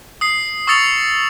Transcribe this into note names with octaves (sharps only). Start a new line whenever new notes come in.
D#6 C7
C#6 D#6 E6 A6 C#7 F7